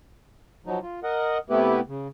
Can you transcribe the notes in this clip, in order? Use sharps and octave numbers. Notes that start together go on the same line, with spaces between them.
F3 F#3 D#4
F4
A#4 D#5 F#5
C3 A3 B3 E4 G4 B4
C#3